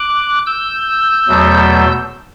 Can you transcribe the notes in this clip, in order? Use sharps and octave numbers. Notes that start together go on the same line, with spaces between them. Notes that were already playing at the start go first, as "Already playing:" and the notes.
Already playing: D6 F#6
E6 G6
E2 B2 F#3 A3